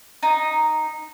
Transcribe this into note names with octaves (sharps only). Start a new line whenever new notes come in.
D#4